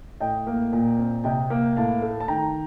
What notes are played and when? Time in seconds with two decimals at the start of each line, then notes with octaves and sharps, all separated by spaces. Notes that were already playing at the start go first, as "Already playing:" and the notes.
0.20 A2 D#5 G5
0.47 A#3
0.73 A#2
0.99 C4
1.24 C3 D#5 G5
1.50 A#3
1.76 A2 F5 A5
2.02 A3
2.20 A5
2.28 D#3 G5 A#5